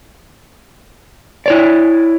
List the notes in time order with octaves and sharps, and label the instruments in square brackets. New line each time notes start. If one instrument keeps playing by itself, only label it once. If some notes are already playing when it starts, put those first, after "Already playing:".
[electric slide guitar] E4 C#5 D5